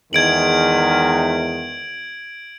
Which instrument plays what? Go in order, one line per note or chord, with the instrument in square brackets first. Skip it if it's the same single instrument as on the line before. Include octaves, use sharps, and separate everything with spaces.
[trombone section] E2 D#3 G#3 [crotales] G#6 D7 F#7